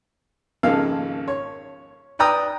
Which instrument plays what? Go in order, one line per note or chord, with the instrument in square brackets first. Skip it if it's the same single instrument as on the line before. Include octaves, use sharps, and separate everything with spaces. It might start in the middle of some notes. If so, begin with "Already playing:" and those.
[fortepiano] G#1 C#3 F3 A#3 A4 F5
C#5
B4 D5 G5 A#5 D#6